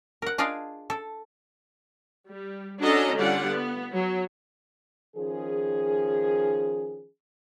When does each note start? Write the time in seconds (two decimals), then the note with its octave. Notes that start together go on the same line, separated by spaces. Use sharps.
0.22 A#4 F#5
0.38 D4 F4 G#4 D5 D#5 F5
0.90 A4
2.28 G3
2.81 C#4 D4 F#4 A4 D#5 A#5
3.16 D3 G3 C#4 F4 D5 F#5
3.48 B3
3.94 F#3
5.16 D#3 F3 C#4 G#4